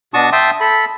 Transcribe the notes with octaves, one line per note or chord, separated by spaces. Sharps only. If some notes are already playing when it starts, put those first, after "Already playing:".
B2 D4 F#4 A5 C#6 D#6
E5 G5 A5 C6 D#6
A4 B5